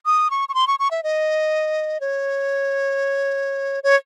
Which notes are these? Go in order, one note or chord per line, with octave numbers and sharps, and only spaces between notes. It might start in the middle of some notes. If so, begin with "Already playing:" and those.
D#6
C#6
C#6
C6
C#6
C#6
E5
D#5
C#5
C#5